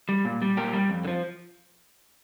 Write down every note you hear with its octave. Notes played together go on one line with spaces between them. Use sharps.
G3
A#2
G3
A#2 G4 A#4
G3
F2
D3
F3